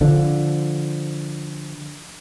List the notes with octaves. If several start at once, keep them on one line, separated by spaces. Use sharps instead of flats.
D3 F3